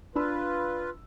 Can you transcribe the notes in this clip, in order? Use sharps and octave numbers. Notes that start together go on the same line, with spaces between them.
D4 F4 B4 B5 E6